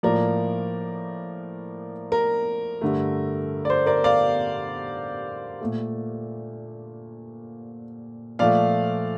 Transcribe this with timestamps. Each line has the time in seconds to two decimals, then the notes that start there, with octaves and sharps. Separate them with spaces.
0.03 A2 F3 A#3 A#4 D5
2.12 A#4
2.81 G2 D3 A3
3.65 D5
3.70 C5
3.86 A#4 D5
4.04 D5 F5
5.61 A#2 A3
8.39 A#2 F3 A3 D5 F5